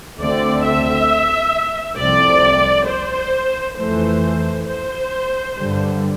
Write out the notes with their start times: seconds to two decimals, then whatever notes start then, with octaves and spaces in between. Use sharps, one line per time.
0.20 D2 D3 A3 C4 D5
0.65 E5
1.98 C2 C3 F3 A3 C4 D5
2.88 C5
3.77 F2 E3 A3 C5
4.67 C5
5.56 G2 D3 G3